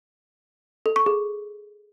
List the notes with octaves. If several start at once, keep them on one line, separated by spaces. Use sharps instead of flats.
A4
C#6
G#4